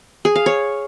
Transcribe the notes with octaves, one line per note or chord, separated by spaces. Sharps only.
G#4
F5
C#5